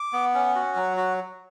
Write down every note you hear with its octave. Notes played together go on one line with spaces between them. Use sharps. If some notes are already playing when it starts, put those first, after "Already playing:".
Already playing: D6
B3
C#4
F#4
F#3
F#4